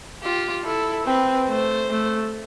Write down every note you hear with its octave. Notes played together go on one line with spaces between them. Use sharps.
F4 G4
E4 A4
C4 B4
A3 C5
A3